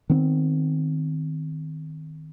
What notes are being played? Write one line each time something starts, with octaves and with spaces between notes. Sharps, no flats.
D#3 B3 C4